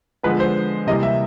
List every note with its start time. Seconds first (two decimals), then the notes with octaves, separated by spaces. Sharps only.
0.23 D3 F3 G#3 B3 B4
0.40 C5
0.87 C3 E3 G3 A#3 D#5
1.03 E5